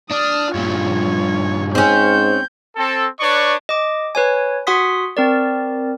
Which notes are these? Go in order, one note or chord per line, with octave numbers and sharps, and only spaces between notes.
D4 D#6 F6
G2 A#2 F4 C#5
G#2 C4 C#4 G6
C4 A4
D4 B4 C#5 D5 C#6
D#5 D6
B4 C#5 G#5
F#4 F#5 C6 D#6 B6
C4 A#4 D5